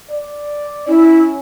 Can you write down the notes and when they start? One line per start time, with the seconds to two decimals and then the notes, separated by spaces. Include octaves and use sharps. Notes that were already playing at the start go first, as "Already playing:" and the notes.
0.11 D5
0.88 C#4 E4